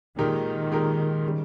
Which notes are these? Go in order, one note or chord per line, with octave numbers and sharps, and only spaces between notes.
A#2 D#3 G#3 D#4 G4 A#4
A#2 G#3 D#4 G4 A#4
C#3 G3